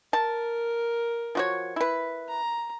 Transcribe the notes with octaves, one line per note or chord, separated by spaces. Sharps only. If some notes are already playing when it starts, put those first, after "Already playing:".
A#4 A5
F3 F#4 C#5
E4 B4
A#5